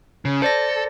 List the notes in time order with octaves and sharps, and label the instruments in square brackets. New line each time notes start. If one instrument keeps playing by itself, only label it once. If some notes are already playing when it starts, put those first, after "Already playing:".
[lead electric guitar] C#3
[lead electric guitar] A4 [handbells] C5 D5 A#6